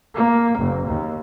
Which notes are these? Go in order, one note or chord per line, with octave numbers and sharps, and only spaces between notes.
A#3
F#1
D#2